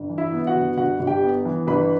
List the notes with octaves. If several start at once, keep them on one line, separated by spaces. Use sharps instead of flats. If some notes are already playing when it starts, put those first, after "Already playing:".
Already playing: G1
E3
E4 E5
B3
F#4 F#5
G1
G1 F#4 F#5
G1
G4 G5
B3
E3
G1 B4 B5